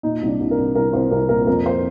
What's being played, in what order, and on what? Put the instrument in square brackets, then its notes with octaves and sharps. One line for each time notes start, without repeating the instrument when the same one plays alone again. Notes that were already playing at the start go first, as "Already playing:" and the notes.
[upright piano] A#2 D#4
C2
D4
C2
A#4
C2
C2 A#4
C2 C5
C2 A#4
A#2 A#4
F2 A#4
C5